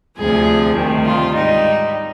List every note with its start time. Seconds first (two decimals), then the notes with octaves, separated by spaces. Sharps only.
0.18 D2 C3 F3 G#4
0.77 D2 C3 D#3 G3
1.05 F4
1.34 G#2 G3 D#4